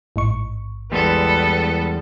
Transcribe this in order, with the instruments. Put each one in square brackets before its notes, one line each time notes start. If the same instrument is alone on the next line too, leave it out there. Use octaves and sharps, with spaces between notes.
[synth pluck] A1 G#2 C#6
[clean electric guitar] E2 G3 G#3 [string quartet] B3 A4